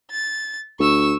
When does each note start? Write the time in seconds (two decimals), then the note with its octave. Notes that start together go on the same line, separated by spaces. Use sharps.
0.11 A6
0.79 D2 C#6 E6